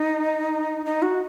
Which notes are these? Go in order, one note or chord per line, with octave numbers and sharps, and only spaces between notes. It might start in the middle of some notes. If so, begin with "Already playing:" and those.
Already playing: D#4
D#4
F#4